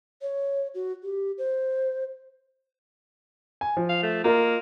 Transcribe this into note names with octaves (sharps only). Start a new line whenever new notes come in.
C#5
F#4
G4
C5
G#5
F3
F5
A3
A#3 F4 A#4 D#5